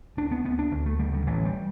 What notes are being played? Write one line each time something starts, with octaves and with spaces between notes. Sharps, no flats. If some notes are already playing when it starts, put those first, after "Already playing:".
D2 D4
B3
D2 B3
D4
D2
A3
D3 G3
D3
A1 E3
G3